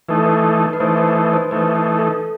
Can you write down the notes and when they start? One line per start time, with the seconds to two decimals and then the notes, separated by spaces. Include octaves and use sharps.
0.09 E3 A3 D#4 B4
0.17 A4
0.26 B4
0.73 B4
0.80 E3 A3 D#4 C5
0.98 B4
1.16 B4
1.33 C5
1.51 E3 A3 D#4 B4
1.75 B4
1.99 A4